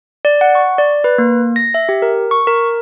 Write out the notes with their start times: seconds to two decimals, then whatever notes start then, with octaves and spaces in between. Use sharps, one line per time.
0.25 D5
0.41 F#5
0.55 C#6
0.78 D5
1.04 B4
1.18 A#3
1.56 A#6
1.74 E5
1.89 G4
2.02 A#4
2.31 C#6
2.47 A#4